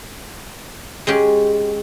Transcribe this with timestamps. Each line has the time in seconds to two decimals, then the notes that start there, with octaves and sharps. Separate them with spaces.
1.07 G#3 C#4 G4